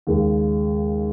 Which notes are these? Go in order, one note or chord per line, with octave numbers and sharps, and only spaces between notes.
D#2 C#3 G#3